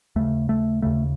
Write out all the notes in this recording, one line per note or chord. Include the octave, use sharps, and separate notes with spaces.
D#2 C#3 A3
A3
D#2 C#3 A3